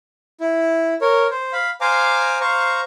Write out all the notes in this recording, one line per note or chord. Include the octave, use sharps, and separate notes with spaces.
E4
A#4 C#5
C5
F5 B5
C5 F5 G#5 A#5 D6
C5 F5 A#5 C#6